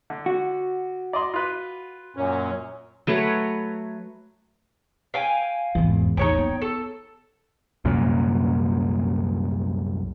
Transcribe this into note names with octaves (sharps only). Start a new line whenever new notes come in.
D3
F#4
D5 D#5 C6
F4 B4
F#2 A#2 C#4
F#3 A3 B4 C#5
F5 G5 G#5
G#1 E2
A1 E2 D#4 C#5 G5
B3
A4
C2 F#2 A#2